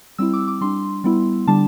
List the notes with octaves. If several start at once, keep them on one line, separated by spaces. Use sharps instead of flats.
G3 C4 E4 E6
D6
D6
G3 D4 C6
G3 B3 E4
D3 G3 D4 A5